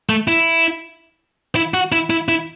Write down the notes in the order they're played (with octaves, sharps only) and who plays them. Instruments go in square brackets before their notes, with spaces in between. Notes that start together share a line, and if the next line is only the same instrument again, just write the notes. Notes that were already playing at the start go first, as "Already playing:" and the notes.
[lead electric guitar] A3
E4
E4
F#4
E4
E4
E4